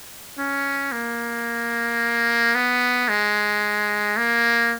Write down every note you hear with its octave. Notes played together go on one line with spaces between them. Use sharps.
C#4
A#3
B3
G#3
A#3